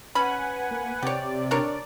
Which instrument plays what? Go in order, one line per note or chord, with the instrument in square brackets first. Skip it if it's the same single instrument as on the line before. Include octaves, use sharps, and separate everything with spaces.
[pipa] C#4 B5 [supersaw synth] B4 F#5 G#5
[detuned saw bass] A#3
[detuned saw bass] C3 [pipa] G4 C#5 [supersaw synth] D5
[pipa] D4 A#4 C#5